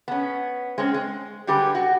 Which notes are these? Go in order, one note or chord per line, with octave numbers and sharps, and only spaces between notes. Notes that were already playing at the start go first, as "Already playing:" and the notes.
B3 C#4
G#3 C4 C#4
G#3
D3 G3 G4 G#4 B4
F#4